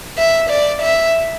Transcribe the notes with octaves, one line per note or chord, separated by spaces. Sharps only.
E5
D5
E5